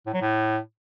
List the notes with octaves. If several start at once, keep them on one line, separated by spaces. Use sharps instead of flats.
A2
F#3
A2